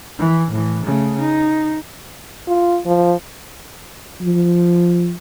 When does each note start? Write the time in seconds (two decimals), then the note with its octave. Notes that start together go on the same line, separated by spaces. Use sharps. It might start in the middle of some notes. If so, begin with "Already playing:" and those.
0.19 E3
0.51 A2 E3
0.84 C#3 A3
1.19 D#4
2.48 F4
2.86 F3
4.21 F3